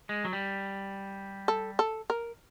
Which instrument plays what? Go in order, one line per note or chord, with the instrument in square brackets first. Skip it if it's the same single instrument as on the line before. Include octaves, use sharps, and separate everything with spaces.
[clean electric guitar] G#3
F#3
G3
[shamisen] A4
A4
A#4